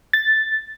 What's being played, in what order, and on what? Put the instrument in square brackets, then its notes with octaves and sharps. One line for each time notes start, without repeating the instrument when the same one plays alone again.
[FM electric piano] A6